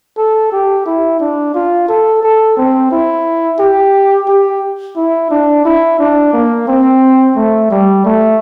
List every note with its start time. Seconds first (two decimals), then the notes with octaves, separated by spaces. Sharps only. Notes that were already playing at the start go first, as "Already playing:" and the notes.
0.17 A4
0.52 G4
0.86 E4
1.20 D4
1.54 F4
1.88 A4
2.22 A4
2.57 C4
2.91 E4
3.59 G4
4.28 G4
4.96 E4
5.31 D4
5.65 E4
5.99 D4
6.33 A#3
6.68 C4
7.36 A3
7.70 G3
8.05 A3